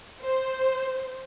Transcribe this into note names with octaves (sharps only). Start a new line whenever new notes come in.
C5